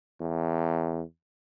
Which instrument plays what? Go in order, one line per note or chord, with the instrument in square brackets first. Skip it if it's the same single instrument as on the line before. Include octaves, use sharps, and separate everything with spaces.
[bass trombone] E2